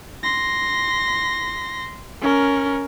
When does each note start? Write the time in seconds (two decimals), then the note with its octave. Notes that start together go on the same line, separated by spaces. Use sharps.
0.24 C6 A#6
2.21 C#4 A#4